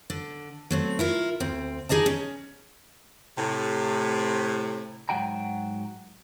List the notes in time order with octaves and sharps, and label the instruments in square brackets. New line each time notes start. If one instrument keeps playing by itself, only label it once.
[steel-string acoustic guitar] D3
F#3 A3 C4
E4 F4 A#4
D2 C4
D#4 G#4 D5 D#5 A5
C#4
[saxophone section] A2 C3
[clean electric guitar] G#2 F#3 F#4 G5 A#5